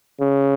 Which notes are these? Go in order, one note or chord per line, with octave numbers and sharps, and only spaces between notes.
C#3